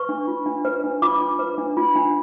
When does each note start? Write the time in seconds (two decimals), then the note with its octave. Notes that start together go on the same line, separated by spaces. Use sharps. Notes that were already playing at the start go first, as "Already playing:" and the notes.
Already playing: B4 C#6
0.09 D4
0.28 F4
0.46 D4
0.65 B4
0.84 D4
1.02 F4 D6
1.21 D4
1.39 B4
1.58 D4
1.77 F4
1.96 D4